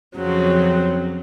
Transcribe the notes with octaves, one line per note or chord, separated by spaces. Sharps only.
F2 C#3 F#3 C4